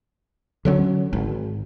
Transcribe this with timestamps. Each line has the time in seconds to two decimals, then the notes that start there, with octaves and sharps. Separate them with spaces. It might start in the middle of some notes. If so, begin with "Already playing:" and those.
0.65 D3 F#3 A#3 C#4
1.13 G#1